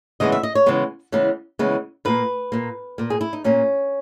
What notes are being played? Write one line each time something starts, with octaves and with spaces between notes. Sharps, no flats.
C#3 E3 G#3 B3 D#5
E5
D#5
C#5
C#3 E3 G#3 B3
C#3 E3 G#3 B3
C#3 E3 G#3 B3
A#2 A#3 B4
A#2 A#3
A#2 A#3
G#4
E4
D#4
A#2 A#3 C#4